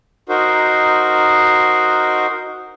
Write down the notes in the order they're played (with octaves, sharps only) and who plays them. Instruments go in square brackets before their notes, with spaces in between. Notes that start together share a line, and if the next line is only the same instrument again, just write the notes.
[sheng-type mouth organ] D#4 F#4 A#4 C5